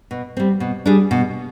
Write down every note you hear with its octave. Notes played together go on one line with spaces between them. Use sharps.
B2
G3 C4
B2
G3 D4 G#4
B2